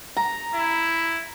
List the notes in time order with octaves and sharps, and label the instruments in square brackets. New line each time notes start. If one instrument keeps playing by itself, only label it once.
[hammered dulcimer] A#5
[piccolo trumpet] E4